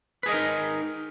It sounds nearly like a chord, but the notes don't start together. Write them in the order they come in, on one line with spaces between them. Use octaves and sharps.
B4 G#4 D#5 A#4 D#4